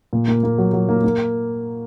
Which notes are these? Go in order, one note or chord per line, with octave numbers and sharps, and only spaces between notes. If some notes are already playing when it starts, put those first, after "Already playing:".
A#2
A#3
A#3
F#3
F#3
A#3
A#3